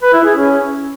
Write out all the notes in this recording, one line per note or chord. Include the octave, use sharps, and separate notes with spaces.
B4
E4
G#4
C#4